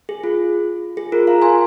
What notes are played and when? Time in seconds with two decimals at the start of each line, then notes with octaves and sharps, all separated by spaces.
0.09 G#4
0.24 F4
0.97 G#4
1.12 F4 A#4
1.27 F5 A#5
1.42 G#5 C6